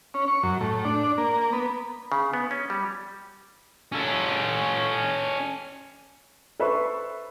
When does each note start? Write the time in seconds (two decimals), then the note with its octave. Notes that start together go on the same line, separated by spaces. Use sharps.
0.14 C#4
0.28 C#6
0.43 F#2
0.61 A2
0.85 D4
1.18 A#3
1.53 B3
2.12 C#3
2.34 B3
2.51 C#4
2.70 G3
3.92 C#4 A4
6.60 A4 B4 C5 E5 B5 C#6